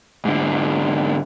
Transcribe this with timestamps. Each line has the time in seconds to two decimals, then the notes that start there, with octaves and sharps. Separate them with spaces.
0.25 G#2 D3